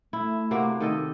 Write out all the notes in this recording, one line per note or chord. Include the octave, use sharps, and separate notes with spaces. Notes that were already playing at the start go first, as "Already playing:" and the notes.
A3 E4
C3 A#3 F#4
D#3 A4 D#5